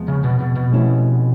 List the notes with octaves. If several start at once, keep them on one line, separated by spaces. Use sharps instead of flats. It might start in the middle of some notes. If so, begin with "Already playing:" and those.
Already playing: E2 C3 F3 G#3 B3
C#3
B2
B2
B2
C3 F3 A3 C#4 E4